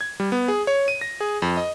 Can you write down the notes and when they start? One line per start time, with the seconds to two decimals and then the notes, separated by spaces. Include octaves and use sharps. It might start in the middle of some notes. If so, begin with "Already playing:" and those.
0.01 G#6
0.20 G3
0.32 B3
0.48 G#4
0.67 C#5
0.88 D#7
1.01 A#6
1.21 G#4
1.42 F2
1.57 D#5